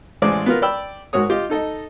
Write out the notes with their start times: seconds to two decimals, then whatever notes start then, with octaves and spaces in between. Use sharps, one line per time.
0.22 A1 G#3 C5 D5 D6
0.46 B3 F4 A#4
0.62 D5 G5 B5 E6
1.13 G#2 F#4 A#4 C#5 D#6
1.30 F4 G4 D#5
1.50 D#4 A4 D#5